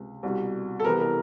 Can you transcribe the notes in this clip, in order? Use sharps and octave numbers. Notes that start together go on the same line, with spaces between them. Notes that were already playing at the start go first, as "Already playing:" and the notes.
Already playing: C#2 C3
C2 B2 G3
A4
C2 C3 E3 G3 B3 A#4
A#4